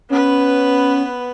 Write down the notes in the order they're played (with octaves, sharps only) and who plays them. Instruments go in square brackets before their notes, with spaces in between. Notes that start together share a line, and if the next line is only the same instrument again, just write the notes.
[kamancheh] B3 B4 [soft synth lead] C#4